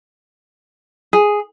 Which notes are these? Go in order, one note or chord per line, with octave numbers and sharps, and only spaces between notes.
G#4